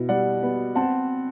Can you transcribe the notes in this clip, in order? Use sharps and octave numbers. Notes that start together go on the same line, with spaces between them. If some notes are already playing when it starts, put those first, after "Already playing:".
Already playing: B2 E4
G3 D5 F#5
B3
C4 F#5 A5